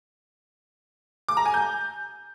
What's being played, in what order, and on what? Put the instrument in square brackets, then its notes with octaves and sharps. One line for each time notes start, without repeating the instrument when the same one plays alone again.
[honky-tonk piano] D6
A#5
G#5
G6